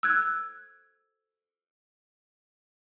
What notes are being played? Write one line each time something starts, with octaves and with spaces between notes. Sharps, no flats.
E6 F#6 G#6